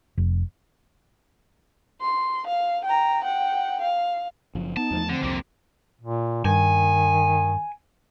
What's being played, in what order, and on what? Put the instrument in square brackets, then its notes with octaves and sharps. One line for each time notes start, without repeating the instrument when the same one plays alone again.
[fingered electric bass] F1
[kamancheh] C6
F5
G5 A#5
F#5 G5
F5
[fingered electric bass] F#1 F3
[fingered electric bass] B3 [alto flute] D#4 [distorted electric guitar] A5
[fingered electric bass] E2 F3 A3
[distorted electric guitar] D3 [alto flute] C4
[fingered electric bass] C2 F2 [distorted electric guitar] D3 A#3
[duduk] A#2
[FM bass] G2 [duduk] D#3 [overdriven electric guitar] G#5